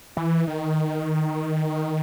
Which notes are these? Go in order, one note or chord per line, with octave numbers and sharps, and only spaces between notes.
E3
D#3